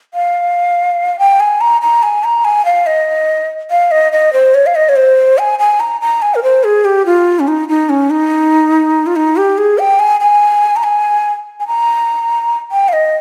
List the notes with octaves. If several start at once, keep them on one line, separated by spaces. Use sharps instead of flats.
F5
G5
G#5
A#5
A#5
G#5
A#5
G#5
F5
D#5
F5
D#5
D#5
C5
C#5
F5
D#5
C#5
C5
G#5
G#5
A#5
A#5
G#5
A#4
C5
G#4
G4
F4
C#4
D#4
D#4
C#4
D#4
F4
D#4
G4
G#4
G5
G#5
G#5
A#5
G#5
G#5
A#5
G5
F5
D#5